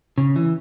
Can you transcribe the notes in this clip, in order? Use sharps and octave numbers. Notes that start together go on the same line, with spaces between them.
C#3
E3